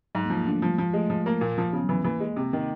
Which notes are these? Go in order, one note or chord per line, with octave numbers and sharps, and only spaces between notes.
G#2 F#3
A#3
F3
A#3
D3 A3
F3 G3
F3 G#3
G#3 A3
F3
A#3
A#2
F3
C#3 B3
F#3
E3
F3
E3 A#3
G#3
C3
D#3